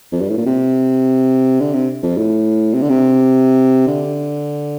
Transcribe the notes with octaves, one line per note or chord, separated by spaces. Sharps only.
F2
G2
A2
A#2
C3
D3
C3
F2
A2
C3
D3
C3
D3